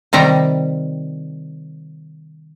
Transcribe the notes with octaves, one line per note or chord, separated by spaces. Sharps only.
C3 D#3 G3 A#5